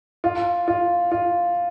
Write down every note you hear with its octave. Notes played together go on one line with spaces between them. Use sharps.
F4
F4
F4